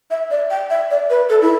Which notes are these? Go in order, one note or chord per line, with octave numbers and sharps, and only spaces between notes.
E5
D5
G5
E5
D5
B4
A4
E4